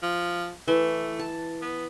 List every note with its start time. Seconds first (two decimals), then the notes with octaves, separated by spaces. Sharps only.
0.02 F3
0.68 E3 A3
1.19 A5
1.61 B3